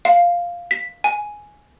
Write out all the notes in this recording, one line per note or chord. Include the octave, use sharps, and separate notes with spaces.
F5
B6
G#5